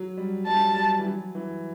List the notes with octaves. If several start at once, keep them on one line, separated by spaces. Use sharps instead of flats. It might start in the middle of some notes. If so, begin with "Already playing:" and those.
Already playing: F#3
G3
G3 A5
F#3
G3
G3
E3
F#3
E3